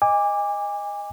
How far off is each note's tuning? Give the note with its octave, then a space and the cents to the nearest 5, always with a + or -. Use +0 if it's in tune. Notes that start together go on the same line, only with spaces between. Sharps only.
D#5 +0 G#5 -30 D6 +0